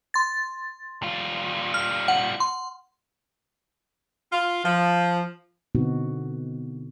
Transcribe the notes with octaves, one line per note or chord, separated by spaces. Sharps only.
C6 A6
G3 F4
F6
F#5
C6
F4
F3
B2 D3 B3 C4 D#4 F#4